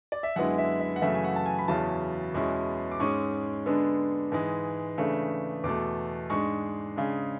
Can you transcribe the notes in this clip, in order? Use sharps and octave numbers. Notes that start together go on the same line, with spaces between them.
D5
E5
F#2 D3 G#3 B3 E4 F#5
E5
E5
F#5
F#2 C#3 E3 A3 E5
G#5
F#5
A5
G#5
B5
E2 C#3 F#3 C#4 E4 A5
E2 B2 G#3 C#4 E4
D6
G#2 G#3 C#4 C#6
D3 G#3 B3 D4
G#2 E3 G#3
C#3 E3 A3 D4
E2 B2 A3 D6
G#2 G#3 D4 C#6
C#3 G#3 D4